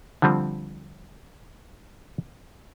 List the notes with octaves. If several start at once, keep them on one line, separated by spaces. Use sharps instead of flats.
D3 F3 G3 C4